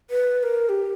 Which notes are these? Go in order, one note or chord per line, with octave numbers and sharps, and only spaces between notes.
B4
B4
A#4
G4